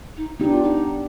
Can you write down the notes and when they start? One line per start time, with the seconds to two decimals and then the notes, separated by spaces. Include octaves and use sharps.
0.16 D#4
0.39 B3 D4 D#4 G4
0.51 F4
0.62 D#4